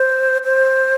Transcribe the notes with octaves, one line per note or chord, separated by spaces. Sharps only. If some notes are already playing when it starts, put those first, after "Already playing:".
Already playing: C5
C5